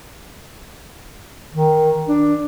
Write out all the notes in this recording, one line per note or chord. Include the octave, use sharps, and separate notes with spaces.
D#3
D4